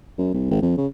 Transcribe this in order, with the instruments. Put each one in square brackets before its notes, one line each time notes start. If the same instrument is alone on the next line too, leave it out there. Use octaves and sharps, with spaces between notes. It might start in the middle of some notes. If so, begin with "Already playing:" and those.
[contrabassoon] F#2
C2
G#1
F2
C#3